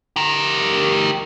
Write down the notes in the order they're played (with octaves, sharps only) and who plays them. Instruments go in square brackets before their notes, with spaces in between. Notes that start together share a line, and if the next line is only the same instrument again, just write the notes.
[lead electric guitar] G4 A#4